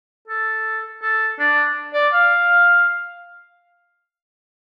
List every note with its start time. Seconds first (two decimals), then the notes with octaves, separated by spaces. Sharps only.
0.28 A4
1.02 A4
1.39 D4
1.94 D5
2.13 F5